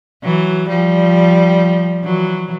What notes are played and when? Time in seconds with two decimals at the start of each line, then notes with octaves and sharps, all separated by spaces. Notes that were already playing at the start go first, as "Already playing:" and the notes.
0.23 E3 F#3
0.69 F3 G3
2.04 E3 F#3